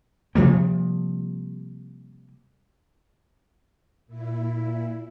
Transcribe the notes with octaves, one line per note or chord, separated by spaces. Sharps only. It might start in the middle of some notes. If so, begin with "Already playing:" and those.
C3 F3 G3 A#3
A#2 E4